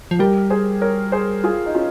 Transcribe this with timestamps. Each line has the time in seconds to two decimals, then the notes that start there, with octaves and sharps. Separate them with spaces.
0.11 F3
0.19 G3 G4 A#4
0.50 G#4 C5
0.81 A#4 C#5
1.12 G#4 C5
1.44 F4 G#4
1.66 D#4
1.75 C#4 F4